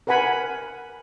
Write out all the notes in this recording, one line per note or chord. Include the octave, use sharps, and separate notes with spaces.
A#4 B4 F#5 G#5 B5